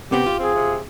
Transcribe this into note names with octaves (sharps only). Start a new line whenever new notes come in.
C3 B3 C4 G4
F4
C4 G#4
C3